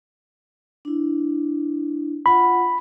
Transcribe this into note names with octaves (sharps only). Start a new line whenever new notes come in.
D4 E4
F4 F#5 B5